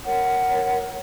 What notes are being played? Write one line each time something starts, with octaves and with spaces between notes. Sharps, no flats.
A#4 C#5 F#5